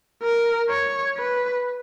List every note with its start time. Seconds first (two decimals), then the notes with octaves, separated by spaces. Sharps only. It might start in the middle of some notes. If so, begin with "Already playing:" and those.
0.23 A#4
0.70 C#5
1.17 B4